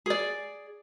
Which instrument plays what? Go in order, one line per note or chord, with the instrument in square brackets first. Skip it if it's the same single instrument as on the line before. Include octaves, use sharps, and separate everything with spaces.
[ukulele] G#4 D5